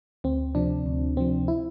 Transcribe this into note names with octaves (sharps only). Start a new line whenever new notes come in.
D2 C4
C3 F3 D4
D2
C3 F3 C4
E4